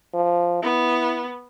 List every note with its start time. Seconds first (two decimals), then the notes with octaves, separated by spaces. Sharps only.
0.14 F3
0.63 B3 E4